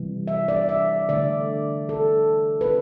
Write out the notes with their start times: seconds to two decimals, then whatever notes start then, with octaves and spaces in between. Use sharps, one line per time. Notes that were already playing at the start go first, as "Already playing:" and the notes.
Already playing: C3 E3 G3
0.28 E5
0.48 D5
0.69 E5
1.09 D3 A3 D5
1.89 A4
2.61 B4